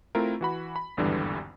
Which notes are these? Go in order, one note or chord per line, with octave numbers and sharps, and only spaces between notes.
A3 C4 E4 F4 A#4
E3 F#4 B5
B5
G#1 E2 G2 D3 E3 G3